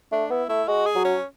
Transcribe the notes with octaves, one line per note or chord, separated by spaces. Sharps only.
A3 D4
B3 E4
A3 E4
G#3 F#4
G#4
F#3
C#4